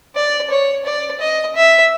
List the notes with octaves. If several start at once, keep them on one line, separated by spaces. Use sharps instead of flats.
D5
C#5
D5
D#5
E5